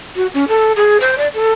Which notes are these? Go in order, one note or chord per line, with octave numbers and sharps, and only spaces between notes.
F#4
C#4
A4
G#4
C5
D5
A4